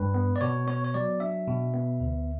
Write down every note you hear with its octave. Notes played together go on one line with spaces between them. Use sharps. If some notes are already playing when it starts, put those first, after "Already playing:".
Already playing: G2 B4
B3
D5
B2 C#5
B3 C#5
C#5
F#3 D5
D4 E5
B2
B3
D2